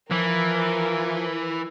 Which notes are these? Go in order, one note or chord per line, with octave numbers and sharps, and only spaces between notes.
E3 F3 A#4